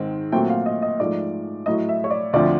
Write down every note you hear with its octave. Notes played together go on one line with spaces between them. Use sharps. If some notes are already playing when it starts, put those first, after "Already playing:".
Already playing: G#2 D#3 G#3 C4
A#2 F#3 A3 C4 G5
F#5
F5
D#5
D#5
G#2 F3 A3 D5
A2 F#3 A3 D#5
E5
C#5
D5
D2 D3 F3 A3 C4 D5